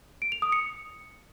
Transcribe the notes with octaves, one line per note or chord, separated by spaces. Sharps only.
D7
F7
D#6
C#7